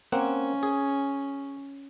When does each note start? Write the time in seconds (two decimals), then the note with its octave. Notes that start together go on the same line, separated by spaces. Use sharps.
0.12 A#3 C4 C#4 F#5
0.63 G#4